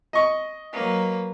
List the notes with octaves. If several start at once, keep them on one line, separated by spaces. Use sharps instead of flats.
D#5 C#6
F#3 A#3 B4